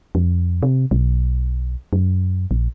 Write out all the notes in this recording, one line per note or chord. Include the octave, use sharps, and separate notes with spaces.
F2
C3
B1
F#2
A#1